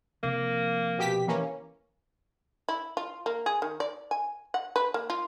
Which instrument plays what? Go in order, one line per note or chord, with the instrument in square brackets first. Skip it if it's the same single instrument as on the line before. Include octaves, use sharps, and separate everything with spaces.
[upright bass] C3 F3 [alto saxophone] A#3
[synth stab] B2 G4 B6
E3 A#3 C#4
[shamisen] E4
F4
A#3
G#4
D#3
D5
G#5
F#5
B4
A#3
F4